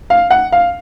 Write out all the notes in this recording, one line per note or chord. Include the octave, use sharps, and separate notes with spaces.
F5
F#5
F5